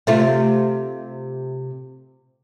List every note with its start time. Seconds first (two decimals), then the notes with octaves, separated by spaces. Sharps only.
0.07 C3 A3 F4